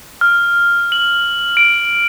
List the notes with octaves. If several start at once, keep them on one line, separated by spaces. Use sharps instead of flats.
F6
F#7
D7